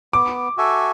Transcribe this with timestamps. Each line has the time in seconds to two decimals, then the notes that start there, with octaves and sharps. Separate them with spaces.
0.13 B3 D6
0.57 F#4 A4 E5 G#5